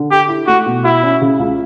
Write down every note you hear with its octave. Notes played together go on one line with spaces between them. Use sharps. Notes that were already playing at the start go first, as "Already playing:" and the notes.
Already playing: D3
G4 A4
E4
A3 F#4
B2
E4 F#4
C#4
C#3
C#2